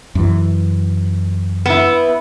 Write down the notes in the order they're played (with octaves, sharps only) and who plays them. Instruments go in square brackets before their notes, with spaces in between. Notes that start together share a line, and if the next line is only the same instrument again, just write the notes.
[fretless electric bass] F#2 E3
[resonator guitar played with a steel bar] B3 E4